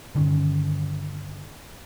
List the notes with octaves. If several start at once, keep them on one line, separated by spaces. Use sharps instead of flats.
G2 D3 D#3 C#4